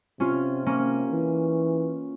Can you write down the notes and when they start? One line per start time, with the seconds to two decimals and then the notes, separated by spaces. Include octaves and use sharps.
0.20 C3 C#4 F4
0.66 A#3 C#4
1.12 E3